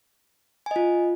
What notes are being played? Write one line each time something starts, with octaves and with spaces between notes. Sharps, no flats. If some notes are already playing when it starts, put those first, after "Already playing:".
F4 D#5 G#5